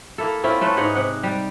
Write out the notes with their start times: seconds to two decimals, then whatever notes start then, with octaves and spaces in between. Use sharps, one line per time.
0.18 A#3 E4 A4
0.43 C4 C#4 E4 F4
0.61 A3 C#4 A4 B4
0.77 G#2 D#4 G#4 F#5
0.95 C3 F#5
1.23 G3 G4